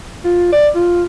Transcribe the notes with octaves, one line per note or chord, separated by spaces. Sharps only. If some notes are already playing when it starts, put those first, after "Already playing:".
F4
D5
F4